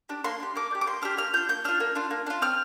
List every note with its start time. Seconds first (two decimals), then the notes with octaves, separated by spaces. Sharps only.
0.09 D4 G4
0.24 A#3 C6
0.40 D4 G4
0.56 A#3 D6
0.71 D4 G4
0.81 D6
0.87 A#3 C6
1.02 D4 G4 F6
1.17 A#3 F6
1.33 D4 F4 G6
1.49 A#3 G6
1.64 D4 F4 F6
1.80 A#3
1.95 D4 F4
2.11 A#3
2.27 D4 F4
2.42 C4 F6